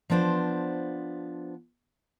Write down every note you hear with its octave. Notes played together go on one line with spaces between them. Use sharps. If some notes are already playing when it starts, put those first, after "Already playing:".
F3 B3 D4 C5